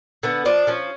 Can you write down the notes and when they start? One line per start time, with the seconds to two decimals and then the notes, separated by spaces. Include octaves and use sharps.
0.23 D3 B3
0.45 F3 D4
0.67 F3 C#4